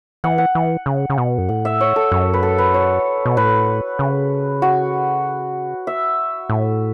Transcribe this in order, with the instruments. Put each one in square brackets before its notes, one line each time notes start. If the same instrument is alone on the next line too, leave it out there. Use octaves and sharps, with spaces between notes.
[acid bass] E3 [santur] F#5
[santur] F#5
[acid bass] E3
C#3
C#3
B2
F#2
[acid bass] A2 [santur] F#5
[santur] E5
C#5
A4
[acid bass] F#2 [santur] F#4
[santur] B4
A4
B4
C#5
[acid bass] B2
[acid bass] A2 [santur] B4
[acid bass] C#3
[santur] F#4
E5
[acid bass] A2